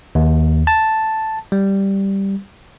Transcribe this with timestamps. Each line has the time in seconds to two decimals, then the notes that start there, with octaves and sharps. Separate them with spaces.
0.15 D#2
0.67 A5
1.52 G3